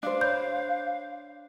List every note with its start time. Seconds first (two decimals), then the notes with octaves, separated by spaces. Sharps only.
0.03 D4 C5 F5
0.21 C#5 B5 G6